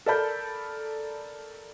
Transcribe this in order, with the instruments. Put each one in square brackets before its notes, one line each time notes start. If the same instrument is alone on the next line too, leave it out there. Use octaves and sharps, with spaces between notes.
[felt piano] A4 A#4 D5 A5 B5 G6